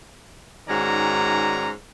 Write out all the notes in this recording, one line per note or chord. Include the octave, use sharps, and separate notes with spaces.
G#2 D#3 C#4 F#4 D5 A#5